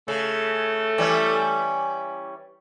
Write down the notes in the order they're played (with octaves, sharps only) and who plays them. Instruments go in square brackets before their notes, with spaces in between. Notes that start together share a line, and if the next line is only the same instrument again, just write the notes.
[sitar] C#3 [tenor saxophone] A3
[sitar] E3 G3 C#4